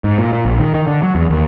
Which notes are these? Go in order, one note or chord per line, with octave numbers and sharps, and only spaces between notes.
G#2
A#2
A#2
A#1
D#3
D#3
D3
F#3
E2
D#2